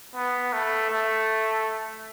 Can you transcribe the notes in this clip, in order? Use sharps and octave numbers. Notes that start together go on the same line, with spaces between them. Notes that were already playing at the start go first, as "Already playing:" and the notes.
B3
A3
A3